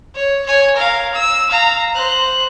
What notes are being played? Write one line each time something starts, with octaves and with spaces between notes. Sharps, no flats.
C#5
C#5 G#5
A#4 F5
E6
F5 A#5
C5 F#6